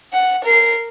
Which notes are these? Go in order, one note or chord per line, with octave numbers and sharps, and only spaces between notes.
F#5
A#4 C7